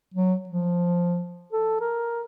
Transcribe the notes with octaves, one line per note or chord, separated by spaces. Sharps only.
F#3
F3
A4
A#4